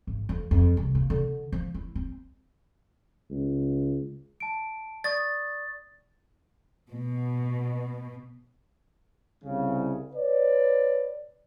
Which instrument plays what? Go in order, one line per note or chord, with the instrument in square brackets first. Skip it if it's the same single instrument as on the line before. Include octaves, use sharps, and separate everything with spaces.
[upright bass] G#1
F2
F2
C2
A#3
D3
F3
E4
C4
[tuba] C#2
[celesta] A5 D7
[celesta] D5 C#6 D#6 [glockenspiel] A6
[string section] B2
[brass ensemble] C2 C#3
B4 C#5 D5